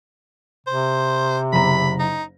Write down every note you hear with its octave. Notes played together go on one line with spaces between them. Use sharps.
C3 C5
F#1 A#5 B5
D#4